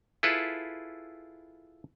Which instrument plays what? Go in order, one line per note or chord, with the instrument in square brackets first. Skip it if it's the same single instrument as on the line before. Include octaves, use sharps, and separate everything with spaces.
[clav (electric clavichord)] E4 F4 G#4 A4 B4